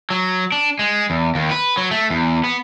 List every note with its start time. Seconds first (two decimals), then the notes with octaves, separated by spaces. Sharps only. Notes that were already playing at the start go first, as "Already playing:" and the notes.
0.10 F#3
0.52 D4
0.79 G#3
1.10 E2
1.35 D#2
1.51 B4
1.78 F#3
1.91 A3
2.10 E2
2.44 B3